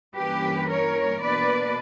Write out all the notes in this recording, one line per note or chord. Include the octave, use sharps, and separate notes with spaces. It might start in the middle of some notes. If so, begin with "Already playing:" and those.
G2 E3 A#3 C#4 G4 B4
A#4 C#5
B2 A#3 D4 B4 D5